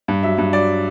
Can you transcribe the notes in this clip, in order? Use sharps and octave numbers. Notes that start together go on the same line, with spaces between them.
G2
F#3 E5
G2
F#3 D5